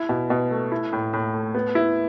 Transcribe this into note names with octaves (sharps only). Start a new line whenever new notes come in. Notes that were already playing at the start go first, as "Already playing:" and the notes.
Already playing: E4
B2
B2
A3
E4
A2
A2
A3
B3
E4